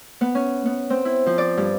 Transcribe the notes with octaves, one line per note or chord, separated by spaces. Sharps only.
B3
C#4
B3
C4
E4
F3
D5
G2